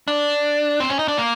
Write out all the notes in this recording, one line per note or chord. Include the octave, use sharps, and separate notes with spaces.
D4
C4
C#4
D#4
D4
A#3